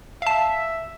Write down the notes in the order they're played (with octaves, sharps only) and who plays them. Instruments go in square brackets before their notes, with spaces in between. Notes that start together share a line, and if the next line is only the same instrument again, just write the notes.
[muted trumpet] E5 [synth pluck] F5 A5